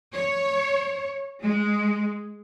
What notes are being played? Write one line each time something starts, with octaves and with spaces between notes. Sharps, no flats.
C#5
G#3